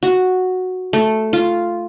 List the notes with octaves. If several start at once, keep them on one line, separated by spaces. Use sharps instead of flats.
F#4
A3
F4